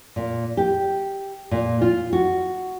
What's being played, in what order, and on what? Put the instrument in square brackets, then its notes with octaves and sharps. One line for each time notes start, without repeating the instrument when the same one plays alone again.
[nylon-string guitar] A#2
G4
A#2
F4
F#4